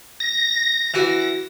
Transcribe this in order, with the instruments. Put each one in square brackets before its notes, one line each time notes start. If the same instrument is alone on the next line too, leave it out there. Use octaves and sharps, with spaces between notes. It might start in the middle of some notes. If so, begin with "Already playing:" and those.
[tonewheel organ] A#6
[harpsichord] E3 F#4